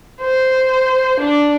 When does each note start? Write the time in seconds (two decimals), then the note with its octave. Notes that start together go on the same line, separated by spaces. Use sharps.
0.21 C5
1.20 D4